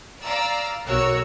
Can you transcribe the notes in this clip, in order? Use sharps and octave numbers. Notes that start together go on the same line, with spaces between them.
D5 F5 A#5 E6
B1 F#4 A#4 C#5 E6